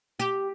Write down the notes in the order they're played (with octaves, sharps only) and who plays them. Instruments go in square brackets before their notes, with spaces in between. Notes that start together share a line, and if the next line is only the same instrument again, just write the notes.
[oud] G4